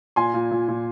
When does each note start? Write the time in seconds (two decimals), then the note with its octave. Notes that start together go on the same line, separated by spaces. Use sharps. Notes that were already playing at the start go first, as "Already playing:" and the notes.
0.16 A#2 G#5 C6
0.34 A#2
0.51 A#2
0.68 A#2